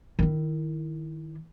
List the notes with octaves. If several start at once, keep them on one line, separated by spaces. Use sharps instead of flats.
D#3 E4